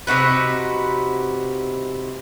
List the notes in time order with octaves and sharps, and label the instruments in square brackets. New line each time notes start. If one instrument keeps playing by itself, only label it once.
[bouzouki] C3 D#4 F#4 B4